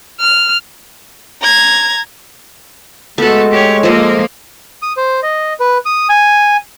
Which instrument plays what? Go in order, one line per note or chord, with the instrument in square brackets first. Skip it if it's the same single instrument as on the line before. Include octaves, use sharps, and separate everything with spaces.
[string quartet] F6
[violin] A#5 G#6
[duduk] G#3 [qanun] A3 F#4 [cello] B3 A4
[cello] G4 C#5
[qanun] F3 A4 D#5 [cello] A#3
[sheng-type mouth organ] D#6
C5
D#5
B4
D#6
G#5